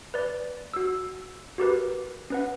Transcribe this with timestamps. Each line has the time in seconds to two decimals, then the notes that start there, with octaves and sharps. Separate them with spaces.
0.14 B4 D5
0.74 F#4 E6
1.58 F#4 G4 A#4 B4
2.30 C#4 B4 F#5